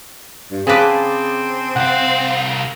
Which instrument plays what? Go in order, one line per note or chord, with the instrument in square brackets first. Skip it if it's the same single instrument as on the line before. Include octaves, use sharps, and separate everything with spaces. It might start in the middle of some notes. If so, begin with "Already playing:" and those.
[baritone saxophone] G2
[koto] C#3 B4 [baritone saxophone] C4 [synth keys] G#4 A5 D6
[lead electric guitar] C2 F5 [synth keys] F#5